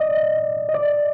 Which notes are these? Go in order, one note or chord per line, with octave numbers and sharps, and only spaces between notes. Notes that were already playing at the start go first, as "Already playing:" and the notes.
Already playing: D5 D#5
D#5
D5